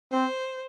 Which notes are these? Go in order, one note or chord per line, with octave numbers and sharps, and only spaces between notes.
C4 C5